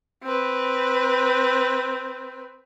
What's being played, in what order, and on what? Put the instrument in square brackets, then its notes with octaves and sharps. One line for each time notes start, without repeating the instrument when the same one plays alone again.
[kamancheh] C4 B4